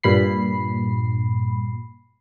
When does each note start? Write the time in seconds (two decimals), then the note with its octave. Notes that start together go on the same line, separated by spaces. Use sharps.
0.03 G2 A#2 B5 C7